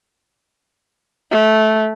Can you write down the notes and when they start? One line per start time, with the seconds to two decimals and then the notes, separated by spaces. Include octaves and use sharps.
1.31 A3